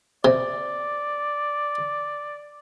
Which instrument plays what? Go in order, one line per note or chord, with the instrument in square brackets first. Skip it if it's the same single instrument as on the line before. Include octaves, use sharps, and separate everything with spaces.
[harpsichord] C3 [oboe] D5